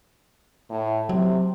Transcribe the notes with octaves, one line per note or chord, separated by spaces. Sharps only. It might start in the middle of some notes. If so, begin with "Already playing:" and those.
A2
C3 F#3